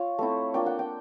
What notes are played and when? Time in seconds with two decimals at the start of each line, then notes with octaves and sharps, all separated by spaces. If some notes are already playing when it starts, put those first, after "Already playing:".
Already playing: F4 C#5
0.19 A3 C4 E4
0.54 A#3 D4 F4 G5
0.66 F#5
0.79 G5